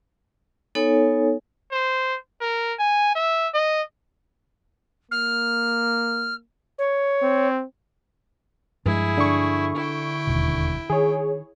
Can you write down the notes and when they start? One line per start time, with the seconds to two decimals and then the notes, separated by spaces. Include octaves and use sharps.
0.75 B3 D#4 A4 C#5 G#5
1.72 C5
2.41 A#4
2.79 G#5
3.15 E5
3.54 D#5
5.11 A#3 F6
6.78 C#5
7.23 C4
8.85 G2 F3 G#3 E4 G#4
9.18 D3 C#6
9.76 E4 G5
10.27 E1 D#2 B2
10.90 D#3 G#4 C#5